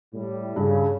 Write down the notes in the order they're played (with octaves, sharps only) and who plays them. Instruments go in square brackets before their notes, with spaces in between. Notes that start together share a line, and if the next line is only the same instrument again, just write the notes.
[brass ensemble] A2 G3
[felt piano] G2 [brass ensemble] C#3